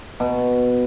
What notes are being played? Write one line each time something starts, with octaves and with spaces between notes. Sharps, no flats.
B2